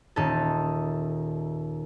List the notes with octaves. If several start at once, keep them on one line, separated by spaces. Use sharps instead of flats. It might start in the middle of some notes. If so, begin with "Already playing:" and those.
D#1 D#4 A4